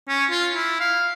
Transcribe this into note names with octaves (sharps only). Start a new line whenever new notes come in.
C#4
F4
E4
F5